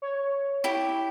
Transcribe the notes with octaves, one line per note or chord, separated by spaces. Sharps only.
C#5
E4 G4